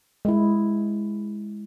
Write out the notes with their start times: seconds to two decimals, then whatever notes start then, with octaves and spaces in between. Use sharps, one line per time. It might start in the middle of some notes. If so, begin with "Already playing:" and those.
0.25 G#3 E4